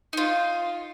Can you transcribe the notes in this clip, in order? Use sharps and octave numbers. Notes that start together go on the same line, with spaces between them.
D#4 F4